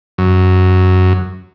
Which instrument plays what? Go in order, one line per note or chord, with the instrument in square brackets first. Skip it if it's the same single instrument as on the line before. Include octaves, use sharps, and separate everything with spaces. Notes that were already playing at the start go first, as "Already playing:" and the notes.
[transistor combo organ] F#2